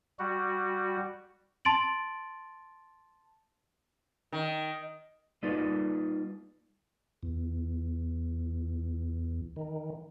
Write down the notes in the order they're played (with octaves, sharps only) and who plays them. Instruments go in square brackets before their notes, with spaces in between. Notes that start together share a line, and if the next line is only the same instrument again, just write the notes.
[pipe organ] G3 F#4
[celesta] A5 C6 A6 D7 F#7
[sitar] D#3
[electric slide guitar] G3 A#3 D#4 F4 B4 D5
[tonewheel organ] E2
D#3